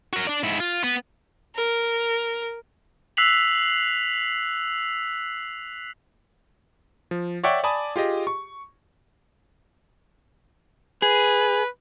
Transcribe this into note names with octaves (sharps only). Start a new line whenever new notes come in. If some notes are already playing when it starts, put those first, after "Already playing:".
F#4 A#4
D4 D5
G#2 E4
F4
B3
A#4
E6 F#6 B6 C7 F7 F#7
F3
C#5 D5 E5 F#5 G5 C#6
D5 G#5 A5 B5 D6 D#6
F4 G4 G#4 D#5
C#6
G#4 B4